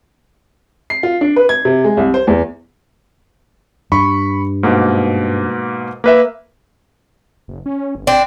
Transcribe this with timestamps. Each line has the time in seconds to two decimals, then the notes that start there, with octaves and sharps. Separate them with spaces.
0.90 C7
1.03 F4
1.21 D4
1.36 B4
1.49 G#6
1.65 C3
1.84 G#3
1.97 C2
2.14 C5
2.27 E2
3.92 G2 B5 C#6
4.63 G#2 B2 A#3
6.04 A#3 B4 E5
7.48 F#1
7.66 C#4
7.95 G1
8.07 C4 D4